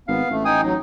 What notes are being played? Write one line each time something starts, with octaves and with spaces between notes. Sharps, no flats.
G#1 B3 F5
A1 A3
D#4 G5 G#5 D#6
F#3 D#4